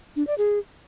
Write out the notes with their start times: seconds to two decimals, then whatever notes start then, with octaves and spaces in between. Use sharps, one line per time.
0.16 D4
0.27 D5
0.38 G#4